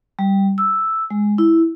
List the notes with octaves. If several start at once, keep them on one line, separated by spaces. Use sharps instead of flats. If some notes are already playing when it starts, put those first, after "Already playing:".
G3
E6
G#3
E4